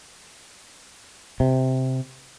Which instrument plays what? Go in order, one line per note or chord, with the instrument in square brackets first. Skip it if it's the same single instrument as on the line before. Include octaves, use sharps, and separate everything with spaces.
[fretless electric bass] C3